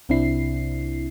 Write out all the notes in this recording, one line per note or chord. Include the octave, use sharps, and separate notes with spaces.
C2 C3 C4 D4 E4 C7